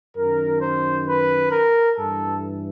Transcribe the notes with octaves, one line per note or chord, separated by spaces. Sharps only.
F#2 D#3 A#4
C5
B4
A#4
G2 E3 A4